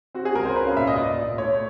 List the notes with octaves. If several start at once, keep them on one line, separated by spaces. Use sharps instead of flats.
C4 F#4
G#4
C#2 A#4
C5
C#4 B4
F5
A#2 E5
D#5
A#2 D5
A#2
A3 C#5